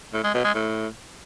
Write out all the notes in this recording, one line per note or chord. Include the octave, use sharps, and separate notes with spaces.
A2
G#3
B2
G#3
A2